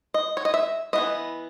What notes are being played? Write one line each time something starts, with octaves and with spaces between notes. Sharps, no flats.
D#5
C#5
D#5
E5
E3 B3 E4 D#5